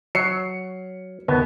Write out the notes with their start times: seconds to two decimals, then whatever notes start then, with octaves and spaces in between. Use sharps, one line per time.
0.15 F#3 C7 C#7
1.28 D#2 B3